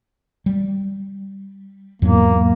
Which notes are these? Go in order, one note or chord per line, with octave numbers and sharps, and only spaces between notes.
G3
E2 G#2 F#3 A#3